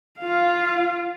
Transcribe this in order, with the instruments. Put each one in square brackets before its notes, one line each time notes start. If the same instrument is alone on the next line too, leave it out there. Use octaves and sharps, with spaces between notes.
[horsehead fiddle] F4 F5